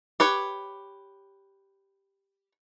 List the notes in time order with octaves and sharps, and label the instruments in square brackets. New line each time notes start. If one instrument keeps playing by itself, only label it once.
[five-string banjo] G4 B4 C#5